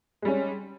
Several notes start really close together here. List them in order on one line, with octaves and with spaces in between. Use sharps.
G#3 G3 C#4